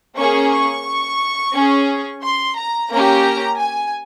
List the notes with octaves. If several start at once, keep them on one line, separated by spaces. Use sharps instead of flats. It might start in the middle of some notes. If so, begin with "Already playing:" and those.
A#3 C#4 G#4 C#6
C#6
C#4 G#4
C6
A#5
A#3 C#4 G4 A#5
G#5